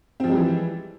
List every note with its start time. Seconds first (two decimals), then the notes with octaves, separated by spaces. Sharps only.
0.20 C4
0.24 F3
0.28 G#3
0.32 G3
0.36 E3